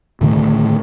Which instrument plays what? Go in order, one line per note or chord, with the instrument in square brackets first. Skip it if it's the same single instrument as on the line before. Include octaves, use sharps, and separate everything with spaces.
[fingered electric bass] A2 D3 D#3 A3